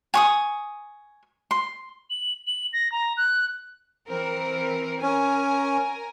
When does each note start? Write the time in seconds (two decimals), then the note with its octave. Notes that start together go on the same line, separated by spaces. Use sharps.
0.14 G#5 C#6 D#6
1.51 C6
2.10 F#7
2.47 F#7
2.73 A#6
2.92 A#5
3.17 F#6
4.09 E3 C4 A#4
5.02 C#4 A#4 G#5